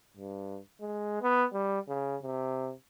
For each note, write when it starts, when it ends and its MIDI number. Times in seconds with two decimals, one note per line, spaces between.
0.17 0.59 43
0.80 1.21 56
1.22 1.45 59
1.53 1.80 55
1.88 2.17 49
2.22 2.72 48